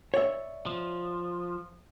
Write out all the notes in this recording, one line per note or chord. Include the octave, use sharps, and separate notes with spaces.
C#5 D5 E5
F3